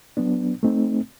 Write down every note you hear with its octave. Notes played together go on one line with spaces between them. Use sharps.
F#3 B3 D4
A3 C4 D#4